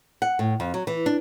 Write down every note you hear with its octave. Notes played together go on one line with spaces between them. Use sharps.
F#5
A2
F2
F#3
E3
D4